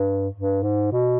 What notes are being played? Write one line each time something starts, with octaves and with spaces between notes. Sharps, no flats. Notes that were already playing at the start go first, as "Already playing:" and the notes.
Already playing: G2
G2
G#2
B2